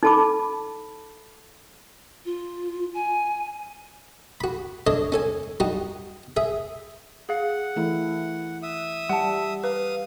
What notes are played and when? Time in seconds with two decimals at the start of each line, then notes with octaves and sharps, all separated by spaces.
0.03 D#4 A4 A5 B5 D6
2.25 F4
2.94 G#5
4.41 F#4 B5
4.87 D4 A4 C#5 D#5
5.12 C#4 A4 G#5
5.60 G3 D#4 F#4
6.37 G#4 E5
7.29 G#4 F5 F#5
7.76 E3 A3 E4
8.63 E5 D#6
9.09 G3 F#5 A5
9.64 B4 F5 D#6